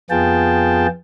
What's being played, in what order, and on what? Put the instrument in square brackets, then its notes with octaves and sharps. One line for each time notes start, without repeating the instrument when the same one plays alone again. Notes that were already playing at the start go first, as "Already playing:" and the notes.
[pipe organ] F2 B3 F4 G#4 G5 A5